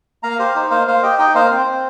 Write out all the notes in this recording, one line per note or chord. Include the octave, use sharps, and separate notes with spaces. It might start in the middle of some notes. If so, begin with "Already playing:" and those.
A#3 F5 A#5
G4 C5 F5
D#4 C5
A#3 C5 F5
A#3 C5 F5
G4 D#5 G5
D#4 D#5 G5
A#3 C5 F5
C4 C5
C4